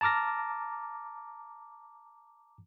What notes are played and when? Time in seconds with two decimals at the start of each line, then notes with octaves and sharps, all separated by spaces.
0.01 A5 A#5 D6 F6 A#6